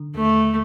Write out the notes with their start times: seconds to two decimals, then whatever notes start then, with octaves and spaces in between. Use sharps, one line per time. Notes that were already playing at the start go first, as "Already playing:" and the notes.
Already playing: D3
0.14 D#2 A3